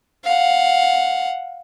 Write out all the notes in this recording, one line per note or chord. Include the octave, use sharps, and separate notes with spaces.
F5 F#5